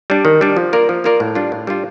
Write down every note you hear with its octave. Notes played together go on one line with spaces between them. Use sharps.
G3 D4
D#3
G3 D4
F3
A#3 F4 A#4 D5
F3
A#3 F4 A#4 D5
A2
G3 D4 F4
A2
G3 D4 F4